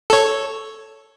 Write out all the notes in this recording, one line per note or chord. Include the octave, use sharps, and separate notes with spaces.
A4 C#5